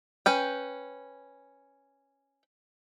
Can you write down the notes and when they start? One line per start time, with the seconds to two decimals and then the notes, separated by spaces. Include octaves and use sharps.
0.26 C#4 B4 G5